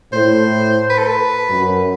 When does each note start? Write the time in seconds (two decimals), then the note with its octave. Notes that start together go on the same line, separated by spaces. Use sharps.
0.13 A2 C5
0.90 B4
0.99 A4
1.07 B4
1.50 F#2